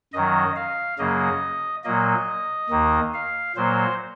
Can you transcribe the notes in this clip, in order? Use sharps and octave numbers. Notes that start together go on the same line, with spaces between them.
F#2 D#3 F#3 D#5
F5
F#2 C#3 F#3 A#3 D#5
A#2 F#3 A#3 D#5
D#2 D#3 A#3
F5
A#2 F#3 A#3 C5